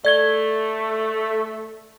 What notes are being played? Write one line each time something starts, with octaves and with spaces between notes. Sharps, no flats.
A3 D5 G#6 G7